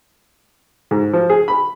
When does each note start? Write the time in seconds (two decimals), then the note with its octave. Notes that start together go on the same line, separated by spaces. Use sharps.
0.91 G#2
1.13 F3
1.30 G#4
1.48 B5